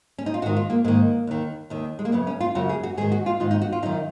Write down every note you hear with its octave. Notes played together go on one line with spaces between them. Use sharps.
C#4
D#4
F4
G#2 D#3 F#4
F4
A#3
G#2 D#3 A#3
D#2 D#3
D#2 D#3
G#3
A#3
F#2 C#3 B3
C#4
F4
F#2 C#3 F#4
G#4
F#4
G#2 D#3 G#4
F#4
F4
G#2 D#3 F4
D#4
F#4
F4
F#2 D#3 D#4